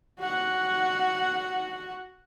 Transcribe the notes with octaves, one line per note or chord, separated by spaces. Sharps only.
F#4 F#5